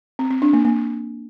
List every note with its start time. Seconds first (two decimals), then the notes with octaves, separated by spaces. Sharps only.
0.19 C4
0.31 C4
0.42 D4
0.53 A#3
0.65 A#3